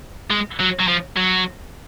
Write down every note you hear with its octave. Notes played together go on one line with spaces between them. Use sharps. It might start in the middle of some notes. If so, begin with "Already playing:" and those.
G#3
F#3
F#3
F3
F#3